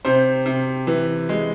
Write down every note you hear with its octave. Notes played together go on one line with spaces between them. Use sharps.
C3 C5
C3
E3
G#3